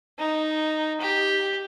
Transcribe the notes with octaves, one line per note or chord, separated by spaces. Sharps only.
D#4
G4